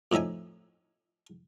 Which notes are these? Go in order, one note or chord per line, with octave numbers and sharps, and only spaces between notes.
F2 A2 D#4 E5 G#5